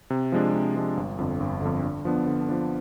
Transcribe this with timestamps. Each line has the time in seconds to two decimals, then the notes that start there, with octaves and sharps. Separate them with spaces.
0.10 C3
0.32 F3 G#3 D4
0.54 C3
0.75 F3 G#3 D4
0.97 G1
1.18 F2 D3
1.40 G1
1.62 F2 D3
1.84 D3
2.05 F3 B3 D4
2.27 D3
2.49 F3 B3 D4